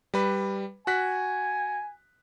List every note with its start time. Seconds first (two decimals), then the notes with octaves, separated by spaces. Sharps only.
0.14 G3 B4
0.87 F#4 G#5 F#6 B6